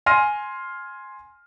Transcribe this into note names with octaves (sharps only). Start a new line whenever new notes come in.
G#5 C6 F6 A#6 D#7